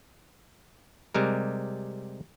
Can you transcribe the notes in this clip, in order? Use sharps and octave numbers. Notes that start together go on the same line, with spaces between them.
C3 G3 G#3 A#4